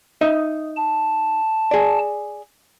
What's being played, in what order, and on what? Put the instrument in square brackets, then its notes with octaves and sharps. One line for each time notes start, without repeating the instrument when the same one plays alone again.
[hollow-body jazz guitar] D#4 D#5 E5
[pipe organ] A5
[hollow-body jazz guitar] G#4 D5